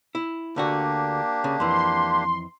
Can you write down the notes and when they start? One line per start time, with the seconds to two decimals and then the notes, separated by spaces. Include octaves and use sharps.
0.15 E4
0.56 D2 D3 A#3 D4 F#4 G4
1.44 C#3
1.60 F2 E3 C6